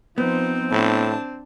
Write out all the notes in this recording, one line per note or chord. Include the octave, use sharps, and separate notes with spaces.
F3 B3 C4 D#4 C5
A2 D4 A5